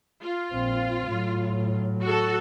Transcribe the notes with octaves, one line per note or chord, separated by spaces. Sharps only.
F4
A#1 C4
A2 F#3
F#4 A4